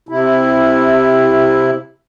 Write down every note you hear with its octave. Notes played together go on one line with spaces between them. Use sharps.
C3 E4